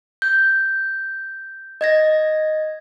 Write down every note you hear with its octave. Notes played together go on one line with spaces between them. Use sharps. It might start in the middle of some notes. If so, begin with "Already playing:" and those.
G6
D#5 G#6 A#6